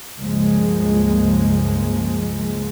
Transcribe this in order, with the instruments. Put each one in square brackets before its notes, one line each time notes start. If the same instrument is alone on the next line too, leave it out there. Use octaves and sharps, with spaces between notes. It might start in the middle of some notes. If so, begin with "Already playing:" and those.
[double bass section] C#2 G2 F3 G#3 A#3